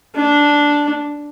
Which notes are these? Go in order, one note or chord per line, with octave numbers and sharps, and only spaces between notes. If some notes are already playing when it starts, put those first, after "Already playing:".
D4